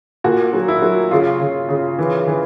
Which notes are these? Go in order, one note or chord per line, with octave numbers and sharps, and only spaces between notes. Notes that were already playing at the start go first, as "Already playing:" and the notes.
A#2 F#4
F#3
E4
F#3
C#3 F4
C#3
C#3
E3
E3